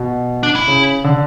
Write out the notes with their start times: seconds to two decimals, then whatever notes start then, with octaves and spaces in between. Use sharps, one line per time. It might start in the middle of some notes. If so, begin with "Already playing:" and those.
Already playing: B2
0.43 D4
0.56 E4
0.68 C#3
1.04 D3